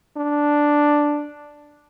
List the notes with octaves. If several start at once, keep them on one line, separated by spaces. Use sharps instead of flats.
D4